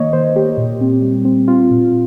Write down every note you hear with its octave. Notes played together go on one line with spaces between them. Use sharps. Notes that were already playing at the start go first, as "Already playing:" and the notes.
Already playing: D#3 A#3 C#5 D#5
D#3 C5
A#3 G4
A#2
C4
G3
C4
C4 F4
A#2